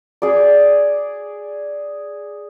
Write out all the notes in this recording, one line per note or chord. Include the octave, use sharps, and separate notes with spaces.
G#4 D5